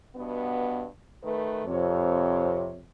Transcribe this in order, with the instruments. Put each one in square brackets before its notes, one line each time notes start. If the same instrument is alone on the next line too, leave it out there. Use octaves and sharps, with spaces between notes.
[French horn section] G2 B2 B3
D#3 A3 B4
[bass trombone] F2 [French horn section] C3 C#5